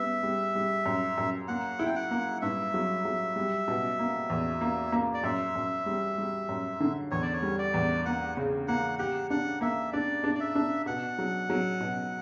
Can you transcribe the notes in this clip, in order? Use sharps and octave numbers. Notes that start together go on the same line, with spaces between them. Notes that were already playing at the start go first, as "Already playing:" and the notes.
Already playing: G3 B3 E5
G3
G3
F#2
F#2
A#3 F#5
E4
G5
F#5
A#3
G2 E5
F#3
F#3
G3
B2
A#3
E2
A#3
A#3
D5
F#2 E5
F#2
G3
G3
F#2
D3
E2 C#5
D5
C#5
G3
D5
E2
A#3 F#5
C#3
A#3 F#5
G4 F#5
D4 F#5
A#3 E5
D4 D5
D4
D5
E5
D4
B2 F#5
F#3
F#3
B2